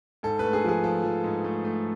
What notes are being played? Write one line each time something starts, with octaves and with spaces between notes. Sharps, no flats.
G#2 A4
A3 B4
G#4
F3 G#4
F3 A4
F3
G#2
A3
A3